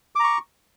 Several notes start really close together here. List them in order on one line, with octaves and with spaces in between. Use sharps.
D6 A#5 C#6